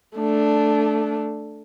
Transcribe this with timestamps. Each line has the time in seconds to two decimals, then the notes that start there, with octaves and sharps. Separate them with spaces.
0.16 A3 D4